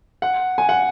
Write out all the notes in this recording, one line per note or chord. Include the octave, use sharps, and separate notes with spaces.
F#5
G#5
F#5